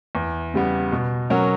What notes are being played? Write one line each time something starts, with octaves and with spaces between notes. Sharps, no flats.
E2
C#3 G3 B3
B2
F#3 C#4 F#4 A#4